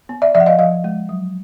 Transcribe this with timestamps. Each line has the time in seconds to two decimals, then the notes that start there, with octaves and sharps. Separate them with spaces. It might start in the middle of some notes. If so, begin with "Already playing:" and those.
0.09 B3
0.22 D5 E5
0.35 F3 D5 E5
0.40 F#5
0.46 D#5 F5
0.59 F3 D#5 F5
0.84 G#3
1.09 F#3